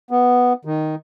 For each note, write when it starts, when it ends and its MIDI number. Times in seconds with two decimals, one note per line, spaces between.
0.11 0.53 59
0.65 0.95 51